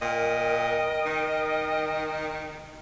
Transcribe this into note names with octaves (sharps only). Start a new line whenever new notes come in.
A#2 A#4 D#5 G5
D#3